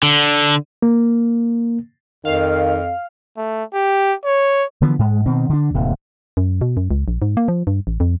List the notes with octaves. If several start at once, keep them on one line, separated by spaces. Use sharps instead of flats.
D3
A#3
F2 D#3 F5
A3
G4
C#5
D3 E3 F3 B3
G#2 G#3
B2 D#3 C4
D3 D4
D1 D#2 C3
F#2
B2
F#2
C#2
A#1
G#2
A#3
F3
G2
A1
F2